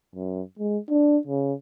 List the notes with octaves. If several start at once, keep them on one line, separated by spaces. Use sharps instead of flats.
F#2
G#3
D4
C#3